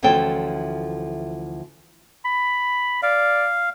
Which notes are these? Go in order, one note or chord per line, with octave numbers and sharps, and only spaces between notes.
D2 E3 F3 C#4 A4 G5
B5
D5 F5